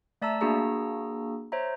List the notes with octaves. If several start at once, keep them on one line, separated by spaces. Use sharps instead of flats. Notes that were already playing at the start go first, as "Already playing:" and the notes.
A3 D5 E5 A5 A#5 E6
A#3 D4 F#4 G#4 A#5 E6
C5 C#5 E5 A#5